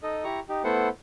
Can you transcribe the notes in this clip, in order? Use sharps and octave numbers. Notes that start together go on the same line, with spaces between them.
D#4 A4 D#5
E4 G4 A#5 C#6
D#4 G4
A3 B3 E4 A4 C5 F#5